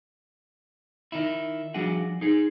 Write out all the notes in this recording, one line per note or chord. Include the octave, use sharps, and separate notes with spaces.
D#3 D#4 E4
F3 G3 D4 F#4 G#4 F#5
D#4 G#4